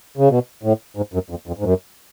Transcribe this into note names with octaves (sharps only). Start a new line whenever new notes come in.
C#3
B2
A2
G#2
F#2
F2
F2
G#2
F#2